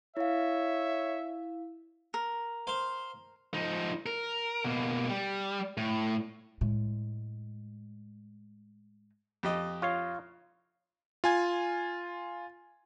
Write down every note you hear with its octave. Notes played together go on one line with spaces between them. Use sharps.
E4 C#5 E5 F5
A#4
C5 F5
F3 D#4
A#4
B2 A#3
G3
A2
A2 G#3
F2 G4 D#5
F4 C#5 F5
F4 G#5 G#6